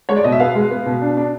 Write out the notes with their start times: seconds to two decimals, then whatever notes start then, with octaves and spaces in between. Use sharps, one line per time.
0.09 G#3 C#5
0.16 D5
0.24 B2 D#5
0.32 E5
0.40 B3 F5
0.55 G#3
0.71 B3
0.86 B2
1.02 D4
1.17 D4